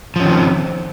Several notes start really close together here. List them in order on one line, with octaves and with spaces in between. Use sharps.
F3 C#4 D#3 C4